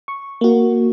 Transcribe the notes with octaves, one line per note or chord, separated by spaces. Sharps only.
C#6
A#3 F#4